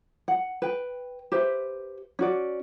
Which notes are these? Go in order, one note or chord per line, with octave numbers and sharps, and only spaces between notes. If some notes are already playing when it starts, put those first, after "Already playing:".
F#5
B4 G5
G4 B4 C5 E5
C#4 F#4 D5